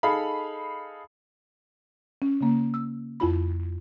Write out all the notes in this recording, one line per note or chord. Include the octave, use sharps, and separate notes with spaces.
D#4 G#4 A4 F5 B5
C#4
C#3 A#3
E6
F2 E4 F4 B5